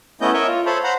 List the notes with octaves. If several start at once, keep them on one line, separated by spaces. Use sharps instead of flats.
A3 B3 C#4 E4 D#5 G6
A#4 C#5 D#5 E5
F4
A4 C5 C#5 A5 B5
C5 F#5 A#5 B5